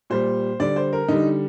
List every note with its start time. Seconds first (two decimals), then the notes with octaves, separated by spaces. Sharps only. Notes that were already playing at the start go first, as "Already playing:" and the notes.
0.10 A#2 G3 C5
0.60 D3 G3 D5
0.76 C5
0.93 A#4
1.08 D3 G3 D#4